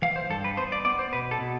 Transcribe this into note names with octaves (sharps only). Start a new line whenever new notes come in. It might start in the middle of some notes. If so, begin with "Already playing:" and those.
E3 F5
C5
G2 A4
B4
B3 C5
D5
B3 D5
C5
B2 B4
A4
B2